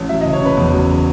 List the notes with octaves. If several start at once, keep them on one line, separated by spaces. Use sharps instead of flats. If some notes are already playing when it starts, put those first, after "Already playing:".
Already playing: A1
F#3 E5
D#5
F#1
C#5
C#3 B4
E2
F#3